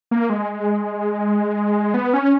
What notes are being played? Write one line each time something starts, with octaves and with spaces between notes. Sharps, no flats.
A#3
G#3
B3
C#4